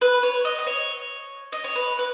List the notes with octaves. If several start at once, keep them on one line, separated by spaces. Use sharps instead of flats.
B4
C#5
D#5
D#5
C#5
D#5
C#5
B4
B4